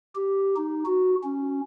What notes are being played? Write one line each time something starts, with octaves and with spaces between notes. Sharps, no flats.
G4
D#4
F#4
C#4